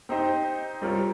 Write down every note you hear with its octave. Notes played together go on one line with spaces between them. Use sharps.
C4 D#4 G4 C5 D#5
G3 C4 F4 A#4 C#5